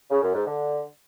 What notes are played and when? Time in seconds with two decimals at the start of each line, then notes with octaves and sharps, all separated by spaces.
0.10 C#3
0.22 F#2
0.34 G#2
0.46 D3